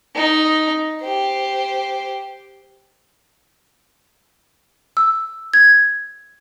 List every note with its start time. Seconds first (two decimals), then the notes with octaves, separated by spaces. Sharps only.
0.15 D#4
1.03 G4 C5
4.97 E6
5.54 G#6